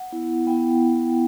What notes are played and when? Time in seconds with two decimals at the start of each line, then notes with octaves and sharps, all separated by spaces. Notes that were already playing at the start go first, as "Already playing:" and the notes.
Already playing: F#5
0.12 B3 E4
0.47 B3 E4 G5